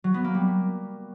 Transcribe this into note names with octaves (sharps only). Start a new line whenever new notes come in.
F#3
B3
A#3
G3